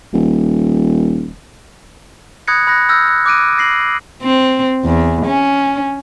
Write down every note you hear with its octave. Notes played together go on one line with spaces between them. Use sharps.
D#1
B5 D#6 F#6 G#6 A#6 C#7
B5 F#6 A#6
E6 F6 G6 A#6
F#6
D6 F#6 D7 D#7
A#6 C7 F#7
C4
E2
C#4